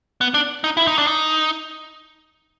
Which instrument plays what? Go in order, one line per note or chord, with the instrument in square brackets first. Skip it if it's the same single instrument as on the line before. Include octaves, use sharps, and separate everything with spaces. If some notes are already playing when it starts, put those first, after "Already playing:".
[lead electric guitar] B3
D4
D#4
E4
D#4
D4
D#4